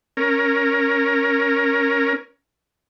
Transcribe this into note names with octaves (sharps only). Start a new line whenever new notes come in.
C#4 A#4